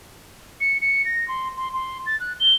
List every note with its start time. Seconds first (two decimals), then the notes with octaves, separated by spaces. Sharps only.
0.61 C#7
0.81 C#7
1.05 A#6
1.28 C6
1.57 C6
1.74 C6
2.06 A6
2.20 F#6
2.40 G7